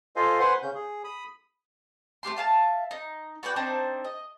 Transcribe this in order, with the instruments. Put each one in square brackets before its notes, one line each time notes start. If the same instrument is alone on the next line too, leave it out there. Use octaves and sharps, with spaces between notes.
[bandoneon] F4 A4 C5 D#5 F5 G#5
B4 C5 F#5 G#5 C6
C#3 C#4 G6
G#4
B5 D#6
[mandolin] A3 C#4 G4 C6
E5 F5 G#5 A5
D#4
F#4 B4 D5 G5
C4 D4 D#4 C5
D#5